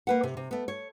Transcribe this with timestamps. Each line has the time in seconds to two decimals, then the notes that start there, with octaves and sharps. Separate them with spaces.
0.07 A#3 B4 F#5
0.23 C3
0.37 C3
0.51 A3 B3
0.68 C#5